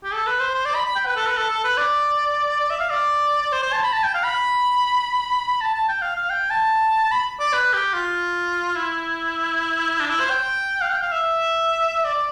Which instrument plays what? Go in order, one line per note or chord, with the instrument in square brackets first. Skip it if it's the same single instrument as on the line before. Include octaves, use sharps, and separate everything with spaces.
[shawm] G4
A4
B4
C5
C5
D5
B5
B5
G5
B4
A4
B4
A4
A4
B4
D5
D5
E5
F5
D5
D5
C5
C5
A5
B5
A5
G5
F5
B5
B5
A5
A5
G5
F5
F5
G5
A5
B5
D5
B4
G4
F4
E4
D4
E4
C5
G5
F5
G5
F5
E5
D5